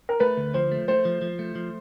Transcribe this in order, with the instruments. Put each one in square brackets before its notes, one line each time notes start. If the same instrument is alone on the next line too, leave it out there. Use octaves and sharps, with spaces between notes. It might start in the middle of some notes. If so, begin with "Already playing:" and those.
[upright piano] A#4
[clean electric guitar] A3 [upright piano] B4
[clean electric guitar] D2
[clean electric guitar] F3 [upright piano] C5
[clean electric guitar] A3
[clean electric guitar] A3 [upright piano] C5
[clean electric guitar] F3
F3
A3
F3